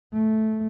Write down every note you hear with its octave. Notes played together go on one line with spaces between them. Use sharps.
A3